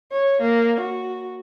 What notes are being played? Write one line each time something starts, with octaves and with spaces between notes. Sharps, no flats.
C#5
A#3
F#4